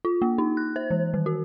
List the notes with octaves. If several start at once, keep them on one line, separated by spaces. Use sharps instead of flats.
F4
A#3
D#4
F#6
C5
E3
D#3
F#4